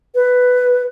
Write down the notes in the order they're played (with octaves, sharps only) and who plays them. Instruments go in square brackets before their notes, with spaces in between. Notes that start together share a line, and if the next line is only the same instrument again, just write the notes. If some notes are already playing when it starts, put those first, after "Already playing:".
[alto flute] B4